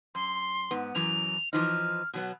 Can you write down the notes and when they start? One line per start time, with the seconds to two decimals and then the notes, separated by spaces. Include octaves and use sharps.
0.15 F#2 C6
0.71 G#2 B3
0.95 F#2 E3 F#3 F7
1.53 E3 F3 D#4 F6
2.13 B2 F#3 B3